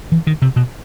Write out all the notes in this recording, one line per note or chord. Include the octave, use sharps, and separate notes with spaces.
E3
D#3
C3
B2